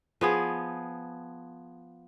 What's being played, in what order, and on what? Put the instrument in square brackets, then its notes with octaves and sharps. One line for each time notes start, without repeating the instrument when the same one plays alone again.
[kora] F3 B3 G#4